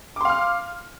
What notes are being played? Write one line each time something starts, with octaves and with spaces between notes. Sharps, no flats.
F5 C6 D6 F6